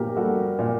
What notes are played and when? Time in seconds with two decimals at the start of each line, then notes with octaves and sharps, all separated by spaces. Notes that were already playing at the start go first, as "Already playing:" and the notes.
Already playing: A#2 F#4 G4 A#4
0.16 G3 F#4 A4
0.59 A#2